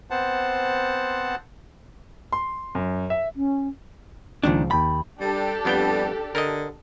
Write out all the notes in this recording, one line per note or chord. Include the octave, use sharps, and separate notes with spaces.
B3 C4 C5 F#5 A5
C6
F#2
E5
C#4
C#2 A#2 D#3 F3 D4
D#2 G5 A5 B5
G3 D4 G4 A4
F2 G3 B3 G5
D3 A#4 D#5